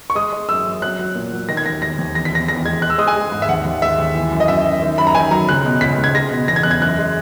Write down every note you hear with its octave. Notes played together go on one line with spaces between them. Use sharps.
C#6
G#3 D#6
G#3
F#2 E6
F#2
F#3 F#6
F#3
A#2
F#3
D#3 A#6
G#6
D#2 A#6
D#2 A#6
D#2
E2 A#6
B6
E2 A#6
E2 A#6
G#3 G#6
G#3 F#6
E6
G#3 D#6
G#5
G#3
G#2
E5
D#2 F#5
D#2
G#3 E5
D#2
E3
F#2
D#5
F#2 E5
F#2
D#3
F#2 B5
A#5
D#3 G#5
F#3 A#5
C#2 F#6
B2
C#2 B6
C#2
G#6
G#3 A#6
B2
E2 A#6
G#6
E2 F#6
G#6
F#2 F#6
G#3